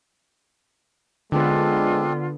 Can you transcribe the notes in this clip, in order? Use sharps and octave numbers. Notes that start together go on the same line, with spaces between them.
D3 G#3 B3 C4 D4 F4